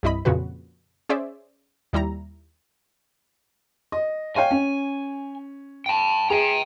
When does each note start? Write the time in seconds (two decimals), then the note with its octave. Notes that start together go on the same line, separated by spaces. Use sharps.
0.03 C2 G2 E4 D#5 B5
0.25 F2 A#2 C#3 F#4 B4
1.09 C#4 G#4 C5 D5 E5
1.93 D#2 G3 E4 A#5
3.92 D#5
4.36 C#5 F5 G5 G#5
4.51 C#4
5.86 G5 A5
6.30 G#4 G5 A#5